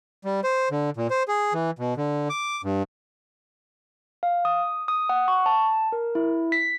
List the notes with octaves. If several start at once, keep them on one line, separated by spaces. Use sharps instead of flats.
G3
C5
D3
A#2
C5
G#4
E3
B2
D3
D6
G2
F5
D#6
D#6
F#5
C#6
A5
A#4
E4
B6